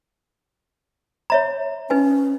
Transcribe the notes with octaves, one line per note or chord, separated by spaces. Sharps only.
C#5 E5 A#5
C#4 D#4 B4 G#5